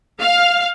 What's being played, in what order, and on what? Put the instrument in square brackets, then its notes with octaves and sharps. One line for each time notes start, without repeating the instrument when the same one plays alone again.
[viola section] F5